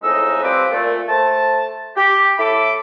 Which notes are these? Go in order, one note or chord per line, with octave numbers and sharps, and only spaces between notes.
F2 A2 G#3 D#4 E6
F3 G3 C4 B4 D6
A#2 A3
A3 C5 A5
G4
A2 E4 A4 B5 D6